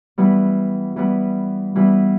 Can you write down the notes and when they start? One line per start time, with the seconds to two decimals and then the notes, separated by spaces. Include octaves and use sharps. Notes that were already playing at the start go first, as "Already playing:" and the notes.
0.18 E3 G3 B3
0.96 E3 G3 B3
1.76 E3 G3 B3